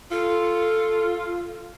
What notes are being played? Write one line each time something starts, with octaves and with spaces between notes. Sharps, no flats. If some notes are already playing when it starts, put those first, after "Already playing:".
F4 A4